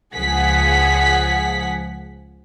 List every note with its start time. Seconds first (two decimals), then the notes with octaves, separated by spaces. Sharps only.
0.15 C#2 F3 G#4 F#5 B6